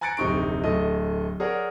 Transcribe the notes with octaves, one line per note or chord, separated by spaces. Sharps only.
G#5 A#5 F#6 A6 C#7 D7
D1 F2 C3 D#4 C#6 D7
D1 A3 D#5 D#6
G#4 A#4 C#5 D5 F#5